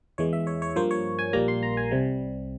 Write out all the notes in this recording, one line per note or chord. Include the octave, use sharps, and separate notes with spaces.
E2 E3 G#3 C#5
E5
C#5
C#5
G2 F3 A#3 C5
C#5
G#5
A#1 A#2 G3 A#3 A#5
C6
A#5
G#5
C2 C3 G3